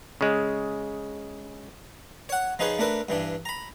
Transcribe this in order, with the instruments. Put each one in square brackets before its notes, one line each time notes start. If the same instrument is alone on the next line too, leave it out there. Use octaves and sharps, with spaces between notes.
[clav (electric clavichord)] C#3 G#3
[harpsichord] C#5 F#5
F3 D#4 G#4 B4 C#5
A3 D4 A#4 B4
G2 E3 D4
A#5 B5